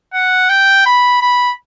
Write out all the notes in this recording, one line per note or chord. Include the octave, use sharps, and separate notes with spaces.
F#5
G5
B5
B5